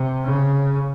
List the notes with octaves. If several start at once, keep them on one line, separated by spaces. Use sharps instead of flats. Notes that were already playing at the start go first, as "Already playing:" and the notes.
Already playing: C3
C#3